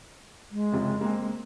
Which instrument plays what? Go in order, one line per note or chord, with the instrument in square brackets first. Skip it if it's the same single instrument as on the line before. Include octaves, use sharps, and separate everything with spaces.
[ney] G#3
[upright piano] F#1 F2 C3
A#3 C4